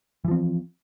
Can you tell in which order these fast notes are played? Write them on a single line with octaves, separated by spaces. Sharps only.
E3 F3 C4